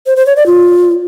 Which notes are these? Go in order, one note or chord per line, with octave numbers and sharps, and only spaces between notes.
C5
C5
C#5
D5
F4